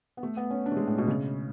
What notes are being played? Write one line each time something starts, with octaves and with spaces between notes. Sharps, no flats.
B3
A3
B3
C#4
D4
A3
G#3
A2
B2
C#3